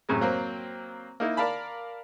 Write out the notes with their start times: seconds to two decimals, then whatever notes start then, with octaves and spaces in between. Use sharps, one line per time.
0.09 F#2 A2 C3 G#3
0.21 F#3 A#3 C4
1.20 A#3 D#4 E4
1.37 A#4 D5 F5 A5 B5